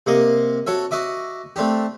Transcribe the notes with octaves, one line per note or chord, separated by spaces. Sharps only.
C3 A#3 D#5
F#4 A4 C#5 E5
F#4 D#5 E5 D6
A3 C4 D4 G4